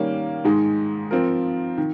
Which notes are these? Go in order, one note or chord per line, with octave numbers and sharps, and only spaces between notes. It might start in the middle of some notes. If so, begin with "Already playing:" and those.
Already playing: D#3 G3 A#3 C#4
G#2 D#3 G#3 D#4
F3 C4 F4 A#4
D#3